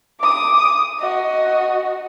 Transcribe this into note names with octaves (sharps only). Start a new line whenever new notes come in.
D6 D#6
F#4 D#5